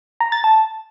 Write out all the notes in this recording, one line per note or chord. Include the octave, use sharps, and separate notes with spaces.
A#5
A6
A5